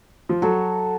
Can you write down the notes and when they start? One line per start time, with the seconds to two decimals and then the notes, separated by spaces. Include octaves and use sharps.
0.29 F3
0.42 F#3 F#4 A4